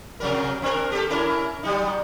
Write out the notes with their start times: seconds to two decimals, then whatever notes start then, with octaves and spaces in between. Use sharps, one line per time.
0.20 C3 F#3 A#4
0.62 C4 D4 A#4
0.92 G4 A4
1.10 C#4 E4 A#4
1.63 F#3 G3 D#4